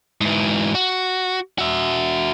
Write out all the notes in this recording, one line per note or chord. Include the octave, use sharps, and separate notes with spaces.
G#2 E3
F#4
F#4 E5